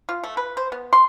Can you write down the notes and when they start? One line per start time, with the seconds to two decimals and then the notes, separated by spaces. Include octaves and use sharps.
0.09 F4
0.23 A3
0.37 B4
0.57 C5
0.72 B3
0.93 C6